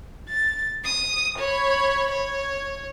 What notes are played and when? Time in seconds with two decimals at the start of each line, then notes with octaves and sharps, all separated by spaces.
0.29 A6
0.85 D#6
1.39 C#5 B5
2.11 C#5